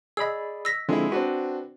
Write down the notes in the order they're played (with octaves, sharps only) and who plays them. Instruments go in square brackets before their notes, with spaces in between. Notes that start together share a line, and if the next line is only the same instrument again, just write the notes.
[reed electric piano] G#4 D5 B5 [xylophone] D#5 E6
[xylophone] E6 A#6 B6
[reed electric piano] D3 F3 C4 [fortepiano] G#3 E4
[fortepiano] C4 D4 F#4 [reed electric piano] B4